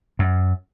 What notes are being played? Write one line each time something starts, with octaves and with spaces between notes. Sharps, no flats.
F#2